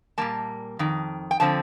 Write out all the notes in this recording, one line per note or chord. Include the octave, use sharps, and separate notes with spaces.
A#2 G3 A#3 A5
F2 D#3
G5
D3 F3 C4 A5